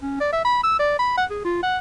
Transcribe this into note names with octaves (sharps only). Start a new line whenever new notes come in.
C#4
D5
E5
B5
E6
D5
B5
F#5
G#4
F4
F#5